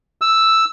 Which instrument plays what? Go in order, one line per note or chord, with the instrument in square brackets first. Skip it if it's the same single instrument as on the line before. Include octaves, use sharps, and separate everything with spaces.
[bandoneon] E6